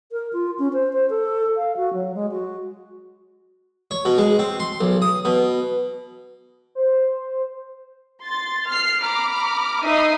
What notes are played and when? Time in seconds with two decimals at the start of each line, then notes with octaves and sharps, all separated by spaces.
0.12 A#4
0.33 F4
0.59 C#4
0.73 C5
0.93 C5
1.10 A4
1.57 F5
1.77 F#4
1.93 F#3
2.15 G#3
2.32 F#4
3.91 C#5
4.05 B2
4.18 G#3
4.39 C4
4.60 C6
4.81 B1
5.02 D#6
5.25 B2
6.75 C5
8.23 C6 A6
8.68 F6 C7
9.02 A#5 B5 D6 F6
9.83 D#4 E5 B5 D#6 C7